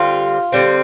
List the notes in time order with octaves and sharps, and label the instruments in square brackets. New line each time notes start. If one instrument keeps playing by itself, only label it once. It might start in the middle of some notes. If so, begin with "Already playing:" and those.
Already playing: [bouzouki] D3 G3 C4 F4
D3 G3 C4